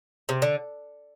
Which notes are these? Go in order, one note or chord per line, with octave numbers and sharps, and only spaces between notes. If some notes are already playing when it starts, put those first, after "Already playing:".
C3
D3